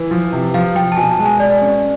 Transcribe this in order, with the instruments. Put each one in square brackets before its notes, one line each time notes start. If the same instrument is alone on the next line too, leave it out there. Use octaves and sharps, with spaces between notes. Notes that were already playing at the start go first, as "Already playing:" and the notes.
Already playing: [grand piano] E3
F3
C3
[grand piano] F3 [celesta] F5
[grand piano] F3 [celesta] G5
[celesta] A5
[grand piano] B2 [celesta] G#5
[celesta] A5
[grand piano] G#3
[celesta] G#5
[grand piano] B2 [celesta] D5
[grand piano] C#4